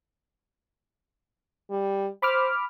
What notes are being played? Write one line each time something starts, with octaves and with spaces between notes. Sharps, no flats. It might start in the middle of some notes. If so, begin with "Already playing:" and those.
G3
C5 B5 D6 F6